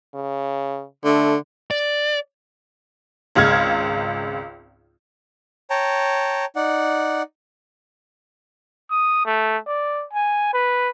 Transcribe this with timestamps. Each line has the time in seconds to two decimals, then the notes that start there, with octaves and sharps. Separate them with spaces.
0.14 C#3
1.05 D3 A3
1.71 D5
3.35 G#1 C#2 G#3 F6 G#6
5.70 C#5 G5 A5 A#5
6.56 D#4 D5 F#5
8.90 D#6
9.25 A3
9.66 D5
10.13 G#5
10.53 B4